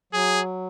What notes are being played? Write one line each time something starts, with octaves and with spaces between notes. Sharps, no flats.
F#3 G#4